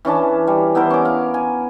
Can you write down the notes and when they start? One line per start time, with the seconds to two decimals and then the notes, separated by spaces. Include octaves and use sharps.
0.05 E3 C#4 D4 A5
0.47 G3
0.75 B3 E4 A#4 C5
0.90 C#4 D6
1.05 F5
1.34 G#5